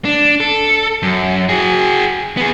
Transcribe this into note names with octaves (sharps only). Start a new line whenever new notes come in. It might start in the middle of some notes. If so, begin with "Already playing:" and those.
D4
A4
F#2
F#4 G#4
B3 G#4